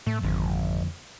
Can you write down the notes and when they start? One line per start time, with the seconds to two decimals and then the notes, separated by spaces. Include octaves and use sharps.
0.06 A2 A3
0.23 G#1 F2 D3 F3